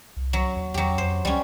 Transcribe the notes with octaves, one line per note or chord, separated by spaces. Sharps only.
C2
F#3
D#2
E2 F#3 G4
F2 C5
C#2 G3 C#4